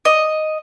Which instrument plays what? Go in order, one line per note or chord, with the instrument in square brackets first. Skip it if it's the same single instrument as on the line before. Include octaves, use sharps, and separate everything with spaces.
[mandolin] D#5